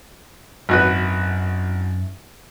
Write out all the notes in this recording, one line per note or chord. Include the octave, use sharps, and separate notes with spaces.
G#1 F#2 E4 F#4 B4